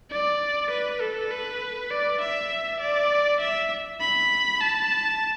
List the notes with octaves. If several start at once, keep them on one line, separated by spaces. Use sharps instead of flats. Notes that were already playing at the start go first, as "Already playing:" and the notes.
D5
B4
A4
B4
D5
E5
D5
E5
B5
A5